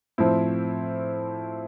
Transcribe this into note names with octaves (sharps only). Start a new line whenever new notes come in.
A2 F3 C4 E4